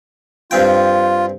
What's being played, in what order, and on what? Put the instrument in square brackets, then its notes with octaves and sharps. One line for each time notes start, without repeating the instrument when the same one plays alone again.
[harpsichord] G2 C4 G5 [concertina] F4